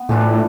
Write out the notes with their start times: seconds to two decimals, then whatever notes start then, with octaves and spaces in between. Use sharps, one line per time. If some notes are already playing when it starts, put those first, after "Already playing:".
Already playing: B3
0.09 A2 E3 A3 D4 F4